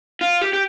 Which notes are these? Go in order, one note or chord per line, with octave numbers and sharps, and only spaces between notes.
F4
G4
G4